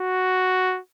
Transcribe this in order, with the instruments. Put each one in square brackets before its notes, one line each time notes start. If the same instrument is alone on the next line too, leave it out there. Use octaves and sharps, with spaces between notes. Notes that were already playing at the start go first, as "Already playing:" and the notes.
Already playing: [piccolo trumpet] F#4